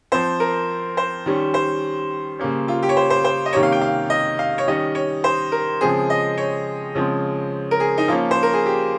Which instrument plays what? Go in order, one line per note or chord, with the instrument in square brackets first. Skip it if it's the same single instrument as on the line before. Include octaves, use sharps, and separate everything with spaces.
[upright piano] F3 C4 C5
A#4
C5
D#3 G3 C#4
C5
C#3 G3 A#3 C#4
F4
G4
C#5
C5
C5
C5
D#5
C3 D#3 G3 A#3 C#4 C#5
F5
G5
F5
D#5
F5
C#5
D#3 G3 C#4 D#5
C#5
C5
A#4
C#3 F3 G#3 C4 G#4
D#5
C#5
C#3 F3 G#3 C4
A#4
G#4
D#4
F3 A#3 C#4 F4
C5
A#4
G#4
G4